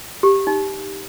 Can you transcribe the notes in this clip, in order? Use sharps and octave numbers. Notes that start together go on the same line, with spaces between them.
G4
D#4